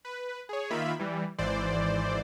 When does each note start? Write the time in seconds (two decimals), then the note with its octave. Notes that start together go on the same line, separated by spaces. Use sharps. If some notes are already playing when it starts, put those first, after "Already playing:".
0.05 B4
0.49 G#4 C#5
0.70 D#3 A#3 F4 E5 B5
0.99 E3 G3
1.38 G#1 G#2 E3 C5 D5